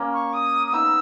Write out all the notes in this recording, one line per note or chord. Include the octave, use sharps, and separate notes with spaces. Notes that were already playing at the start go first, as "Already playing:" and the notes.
Already playing: A#3 C#4
C#6
D#6
D#6
B3 D#4 E6